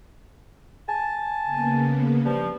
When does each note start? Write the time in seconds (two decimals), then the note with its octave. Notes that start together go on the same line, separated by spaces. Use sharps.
0.88 G#5 A5
1.44 C#3 A#3 B3
2.24 G2 F3